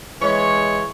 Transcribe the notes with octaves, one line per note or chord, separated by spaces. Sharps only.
E3 G#3 C#5